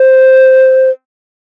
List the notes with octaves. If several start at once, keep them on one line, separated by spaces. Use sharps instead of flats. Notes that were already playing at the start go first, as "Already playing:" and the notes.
Already playing: C5